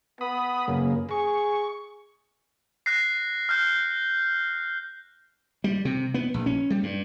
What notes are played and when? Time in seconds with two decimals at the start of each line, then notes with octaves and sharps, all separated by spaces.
0.21 B3 B5 D#6
0.68 F#2 C#3 A#3
1.11 G#4 C#6
2.86 F#6 A#6 C7
3.49 F6 G6
5.64 G3
5.85 C3
6.14 B3
6.34 A#1
6.46 C#4
6.70 G3
6.83 G2